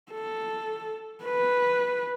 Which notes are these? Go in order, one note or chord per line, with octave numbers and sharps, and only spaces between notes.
A4
B4